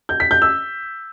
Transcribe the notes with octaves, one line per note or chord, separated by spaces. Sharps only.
G6
B6
G6
E6